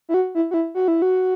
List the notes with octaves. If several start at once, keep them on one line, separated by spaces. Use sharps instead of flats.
E4
F#4
E4
F#4
E4
F#4
E4
F#4